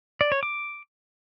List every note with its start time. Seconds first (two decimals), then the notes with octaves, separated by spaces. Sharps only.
0.21 D5
0.32 C#5
0.43 D6